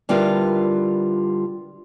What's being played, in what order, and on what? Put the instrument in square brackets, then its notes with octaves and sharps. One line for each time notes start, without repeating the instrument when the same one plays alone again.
[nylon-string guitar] D3 G3 E4 F4 A#4 B4